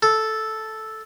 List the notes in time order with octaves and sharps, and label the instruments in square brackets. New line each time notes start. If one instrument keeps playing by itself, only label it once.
[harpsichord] A4